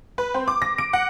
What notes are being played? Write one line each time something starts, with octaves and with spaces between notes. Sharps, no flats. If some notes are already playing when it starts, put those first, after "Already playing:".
B4
C4
D6
A#6
D7
F#5